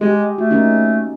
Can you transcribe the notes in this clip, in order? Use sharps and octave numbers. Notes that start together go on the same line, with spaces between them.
G#3 G4 G#4
A3 F#4
A#3 C#4 D#4